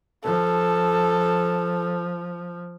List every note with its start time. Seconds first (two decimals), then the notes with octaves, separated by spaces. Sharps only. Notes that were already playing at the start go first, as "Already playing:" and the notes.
0.24 F3 A4